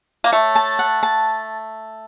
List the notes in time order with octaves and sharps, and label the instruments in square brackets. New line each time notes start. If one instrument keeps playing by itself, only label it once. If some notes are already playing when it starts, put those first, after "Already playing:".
[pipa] A#3
[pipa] A3 [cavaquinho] C#5
[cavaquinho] A5
F#5
A5